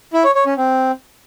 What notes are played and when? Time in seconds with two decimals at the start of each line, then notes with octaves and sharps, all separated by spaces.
0.13 E4
0.24 C#5
0.35 C#5
0.46 C#4
0.57 C4